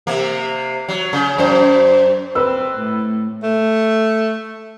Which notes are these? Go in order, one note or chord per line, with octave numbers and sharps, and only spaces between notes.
C3 A#3
F#3
C#3
F#2 C5
C4 B4 E6
A2
A3